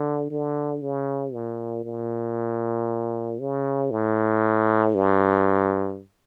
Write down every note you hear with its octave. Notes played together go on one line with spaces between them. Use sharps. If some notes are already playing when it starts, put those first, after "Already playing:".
Already playing: D3
D3
C#3
A#2
A#2
C#3
A2
G2